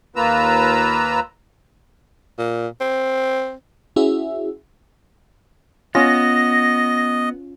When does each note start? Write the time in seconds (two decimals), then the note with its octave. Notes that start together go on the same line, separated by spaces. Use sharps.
0.16 D#2 A#3 F4 B4 A#5 E6
2.38 A#2
2.81 C4
3.96 C#4 E4 F#4 G#4 E5
5.95 B3 C#4 F4 D#5 A#6